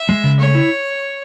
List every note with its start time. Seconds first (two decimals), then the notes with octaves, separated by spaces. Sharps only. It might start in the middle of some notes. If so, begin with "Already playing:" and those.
Already playing: E5
0.09 G#3
0.24 C#3
0.39 A3 C#5
0.55 E4